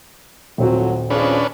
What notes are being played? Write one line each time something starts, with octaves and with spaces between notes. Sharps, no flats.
D#1 A2 F3 F#3 C4 F#4
F2 C#3 C#4 D4 B4